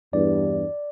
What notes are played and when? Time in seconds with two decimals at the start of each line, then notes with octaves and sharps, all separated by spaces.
0.13 E2 G2 D5